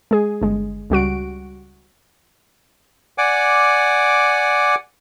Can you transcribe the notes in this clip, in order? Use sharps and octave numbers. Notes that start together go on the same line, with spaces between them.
G#3 G#4
G1 G#3
C#2 G3 F#4 D7
D5 F#5 G#5 D6